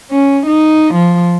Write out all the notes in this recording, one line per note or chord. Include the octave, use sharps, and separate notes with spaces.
C#4
D#4
F3